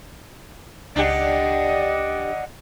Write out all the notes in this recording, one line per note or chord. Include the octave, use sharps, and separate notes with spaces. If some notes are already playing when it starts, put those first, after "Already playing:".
C#2 D4 G4 D5 D#5 F#5